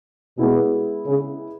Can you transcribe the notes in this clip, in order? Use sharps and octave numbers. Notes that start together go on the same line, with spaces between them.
B2 G#3 B3 E4 G#4
C#3